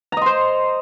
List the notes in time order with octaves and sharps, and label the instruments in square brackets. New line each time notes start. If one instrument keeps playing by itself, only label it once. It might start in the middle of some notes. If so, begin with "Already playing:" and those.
[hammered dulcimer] A#5
D#5
C6
C5